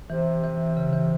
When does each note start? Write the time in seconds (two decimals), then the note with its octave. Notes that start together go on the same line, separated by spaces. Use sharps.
0.09 C3 E3
0.44 E3
0.77 C#3
0.93 E3